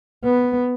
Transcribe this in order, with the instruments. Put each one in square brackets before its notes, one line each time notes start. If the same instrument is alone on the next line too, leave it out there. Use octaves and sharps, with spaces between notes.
[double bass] B3